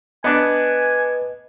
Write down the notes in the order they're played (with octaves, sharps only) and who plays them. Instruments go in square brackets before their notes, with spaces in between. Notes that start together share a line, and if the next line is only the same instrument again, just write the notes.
[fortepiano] B3 D4 [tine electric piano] B4 D#5 [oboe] G#5